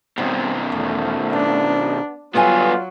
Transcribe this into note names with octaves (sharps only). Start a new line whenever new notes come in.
B2 D#3 G3 C4
E2 A3
B3 D4
G2 D3 F#3 B3 F4 G4 G#5